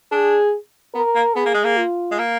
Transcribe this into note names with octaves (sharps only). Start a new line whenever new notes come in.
D4 G#4
B3 A#4
A#3
B3 G#4
A#3
G#3
A#3
F4
G#3
A#3